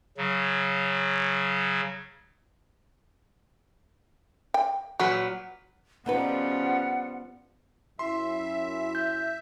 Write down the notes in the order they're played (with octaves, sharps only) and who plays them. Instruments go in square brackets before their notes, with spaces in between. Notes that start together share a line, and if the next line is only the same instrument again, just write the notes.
[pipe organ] C#3 F#3
[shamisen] G5
[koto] A#2 F#3 B4 [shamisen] F#4
[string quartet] C#3 F3 G3 [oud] B3 D#4 B4 [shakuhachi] F#5
[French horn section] F#2 E4 [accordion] E5 [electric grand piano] C6
[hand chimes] G6